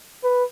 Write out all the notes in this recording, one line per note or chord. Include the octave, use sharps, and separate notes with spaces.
B4